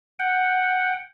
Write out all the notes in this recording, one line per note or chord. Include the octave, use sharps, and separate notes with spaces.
F#5 G5